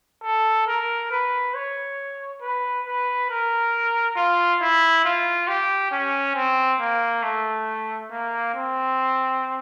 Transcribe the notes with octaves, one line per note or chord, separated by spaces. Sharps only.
A4
A#4
B4
C#5
B4
B4
A#4
F4
E4
F4
G4
C#4
C4
A#3
A3
A#3
C4